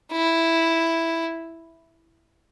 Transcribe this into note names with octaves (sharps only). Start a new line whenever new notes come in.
E4